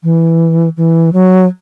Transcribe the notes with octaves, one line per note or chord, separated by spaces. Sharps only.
E3
E3
F#3